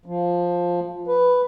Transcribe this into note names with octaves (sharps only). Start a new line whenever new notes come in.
F3
B4